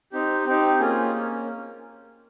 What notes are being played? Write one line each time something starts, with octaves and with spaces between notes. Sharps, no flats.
C4 D#4 G4
C4 D#4 G4
A#3 C#4 F4 G#4
A#3 C#4